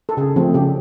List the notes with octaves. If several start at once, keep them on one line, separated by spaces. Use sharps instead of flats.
A4
C#3 G#4
F3 A3 C4
C#3 G4